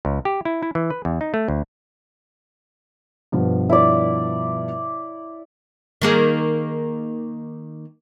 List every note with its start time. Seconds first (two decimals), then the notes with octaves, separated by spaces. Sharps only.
0.05 C#2
0.25 G4
0.45 E4
0.63 E4
0.75 E3
0.90 B4
1.05 E2
1.21 D#4
1.34 A3
1.48 D2
3.32 G2 B2 F3
3.69 E4 D5
6.02 D#3 A#3 G#4